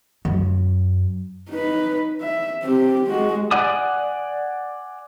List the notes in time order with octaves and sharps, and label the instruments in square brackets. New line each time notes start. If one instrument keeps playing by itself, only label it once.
[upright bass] F#2
[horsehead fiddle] D#4 B4
E5
C4 G4
G#3 F#4
[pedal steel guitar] D5 F#5 G#5 D6 D#6